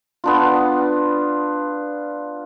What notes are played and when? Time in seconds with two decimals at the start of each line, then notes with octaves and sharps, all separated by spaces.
0.24 B3 D4 F4